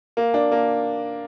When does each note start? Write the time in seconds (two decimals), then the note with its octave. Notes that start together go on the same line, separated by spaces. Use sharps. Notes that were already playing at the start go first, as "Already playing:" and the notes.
0.17 A#3
0.34 D4
0.52 A#3